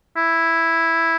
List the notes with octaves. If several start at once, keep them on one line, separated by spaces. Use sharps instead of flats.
E4